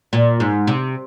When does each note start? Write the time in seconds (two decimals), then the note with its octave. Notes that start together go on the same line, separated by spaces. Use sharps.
0.13 A#2
0.40 G#2
0.67 C3